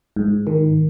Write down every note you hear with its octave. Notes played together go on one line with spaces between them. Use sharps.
G#2
D#3